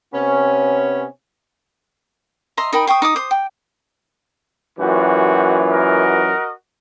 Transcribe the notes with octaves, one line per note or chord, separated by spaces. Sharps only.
C3 B3 C#4
D#5 E5 A#5 C6
D#4 A#4 G5 B5
C5 G5 C#6 D#6
D#4 D6 D#6
C5 D#6
G5
F#2 A#2 E3 F#4 G4
F#4 A#4 D#5